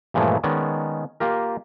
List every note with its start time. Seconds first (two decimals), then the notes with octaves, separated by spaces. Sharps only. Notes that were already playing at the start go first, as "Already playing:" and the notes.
0.14 G2 A#2 E3 F3 G#3 A3
0.44 D#3 G#3 B3 C#4 D5
1.20 A#3 F4 G4 A#4